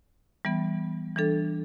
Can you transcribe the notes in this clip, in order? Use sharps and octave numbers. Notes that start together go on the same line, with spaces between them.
E3 G3 B3
E3 G3 D4 A4